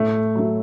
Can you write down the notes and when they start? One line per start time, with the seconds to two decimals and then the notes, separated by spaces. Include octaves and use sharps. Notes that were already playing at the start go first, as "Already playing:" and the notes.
Already playing: A2 A3
0.35 F#3 A3